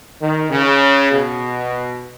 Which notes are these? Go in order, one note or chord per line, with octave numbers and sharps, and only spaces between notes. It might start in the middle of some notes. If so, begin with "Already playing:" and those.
D#3
C#3
B2